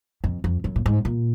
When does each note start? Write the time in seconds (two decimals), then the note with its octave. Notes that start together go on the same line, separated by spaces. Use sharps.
0.24 F2
0.44 F2
0.64 F#2
0.76 A#2
0.86 G#2
1.05 A#2